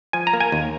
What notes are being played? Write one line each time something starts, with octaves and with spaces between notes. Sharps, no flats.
F3 G#5
A#5
A#3
G#5
D#2